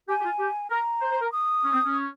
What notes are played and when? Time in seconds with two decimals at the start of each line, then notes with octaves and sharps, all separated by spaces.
0.08 G4 G#5
0.20 G4
0.24 F4
0.39 G4
0.70 A#4 A#5
1.01 C5
1.11 C5
1.21 A#4
1.32 D#6
1.64 C#4
1.73 C4
1.84 C#4